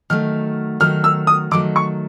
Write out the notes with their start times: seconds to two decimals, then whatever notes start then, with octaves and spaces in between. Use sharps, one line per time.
0.10 D#3 F#3 A3 F6
0.80 D#3 F#3 A3 F6
1.04 E6
1.27 D#6
1.51 D#3 F#3 A3 D6
1.76 C#6